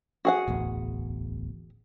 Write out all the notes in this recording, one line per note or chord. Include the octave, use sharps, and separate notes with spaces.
F#4 G#4 F#5
D1 A1 E2